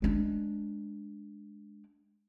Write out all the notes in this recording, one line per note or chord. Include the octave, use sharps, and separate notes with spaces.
G#3 D4